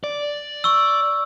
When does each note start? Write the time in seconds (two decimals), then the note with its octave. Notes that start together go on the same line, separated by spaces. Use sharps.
0.04 D5
0.64 C#6 E6